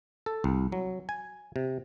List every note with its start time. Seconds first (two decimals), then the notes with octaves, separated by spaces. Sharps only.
0.26 A4
0.44 C2
0.72 F#3
1.09 G#5
1.56 C3